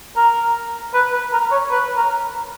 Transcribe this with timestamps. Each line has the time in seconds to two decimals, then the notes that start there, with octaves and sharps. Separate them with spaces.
0.16 A#4
0.94 B4
1.12 B4
1.33 A#4
1.51 C#5
1.71 B4
1.97 A#4